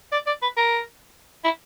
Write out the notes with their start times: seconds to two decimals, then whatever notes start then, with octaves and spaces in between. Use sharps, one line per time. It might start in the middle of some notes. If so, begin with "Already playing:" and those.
0.12 D5
0.27 D5
0.42 B4
0.57 A#4
1.44 E4